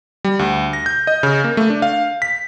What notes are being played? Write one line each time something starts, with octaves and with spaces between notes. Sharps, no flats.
G3
D2
A#6
G6
D#5
C#3
A#3
A3
D4
F5
B6